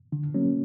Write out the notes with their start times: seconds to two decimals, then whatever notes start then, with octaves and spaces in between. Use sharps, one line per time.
0.12 D3
0.34 F#3 A#3 C#4